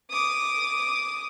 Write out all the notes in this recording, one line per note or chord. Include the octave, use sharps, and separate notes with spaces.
D6 D#6